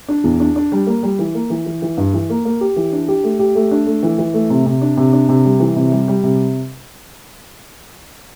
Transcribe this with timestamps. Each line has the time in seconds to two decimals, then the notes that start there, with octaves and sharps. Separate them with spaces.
0.08 D4
0.24 E2
0.40 D4
0.56 D4
0.72 G3
0.87 A#3
1.03 G3
1.19 E3
1.34 A#3
1.50 E3
1.66 E3
1.82 E3
1.97 G2
2.13 E3
2.30 A#3
2.45 A#3
2.61 G4
2.76 E3
2.92 D4
3.08 G4
3.24 A3
3.39 G4
3.55 A3
3.71 D4
3.87 A3
4.03 E3
4.18 E3
4.34 A3
4.50 C3
4.66 C3
4.81 D4
4.97 C3
5.13 D4
5.29 C3
5.45 G3
5.60 E3
5.76 C3
5.92 G3
6.08 G3
6.23 C3